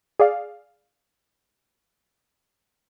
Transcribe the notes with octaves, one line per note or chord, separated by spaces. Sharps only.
G#4 D5 F5